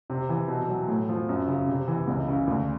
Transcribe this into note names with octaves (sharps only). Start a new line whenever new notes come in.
C3
E3
B2
F#3
A2
F3
F#2
C#3
C3
E3
C#2
C#3
D2